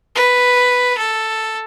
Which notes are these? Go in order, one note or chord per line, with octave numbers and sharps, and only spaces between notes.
B4
A4